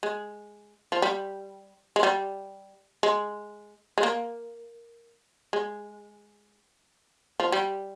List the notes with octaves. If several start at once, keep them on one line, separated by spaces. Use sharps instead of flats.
G#3
F3
G3
G#3
G3
G#3
G#3
A#3
G#3
F3
G3